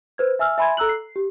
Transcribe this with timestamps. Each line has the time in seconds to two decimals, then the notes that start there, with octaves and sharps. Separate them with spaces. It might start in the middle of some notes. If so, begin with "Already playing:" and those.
0.18 B4 C5 G#6
0.39 E5 G#5 E6 F6
0.58 E5 G#5 B5 C6 G#6
0.77 A4 A#5 E6 F#6 F#7
0.89 C7
1.16 G4